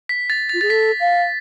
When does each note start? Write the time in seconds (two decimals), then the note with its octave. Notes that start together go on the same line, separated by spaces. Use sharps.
0.09 B6
0.30 A6
0.49 A6
0.54 F4
0.61 G#4 A6
0.70 A4 B6
1.00 F5